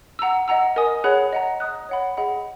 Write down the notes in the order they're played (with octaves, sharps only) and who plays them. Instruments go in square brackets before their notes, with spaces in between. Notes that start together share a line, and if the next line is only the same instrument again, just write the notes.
[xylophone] F#5 A#5 E6
D#5 F#5 A#5 E6
A#4 D#5 G#5 D#6
G#4 C#5 F#5 B5 F#6
D#5 F#5 A#5
D#5 A#5 D#6 F#6
C#5 F#5 B5
G#4 D#5 F#5 B5